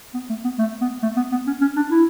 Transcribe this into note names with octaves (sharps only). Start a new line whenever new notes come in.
B3
A3
B3
A3
B3
A3
B3
B3
C#4
C#4
D4
E4